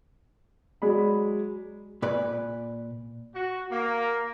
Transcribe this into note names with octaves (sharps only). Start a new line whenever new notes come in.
F#3 G#3 D5 B5
A#2 B4 D5
F#4
A#3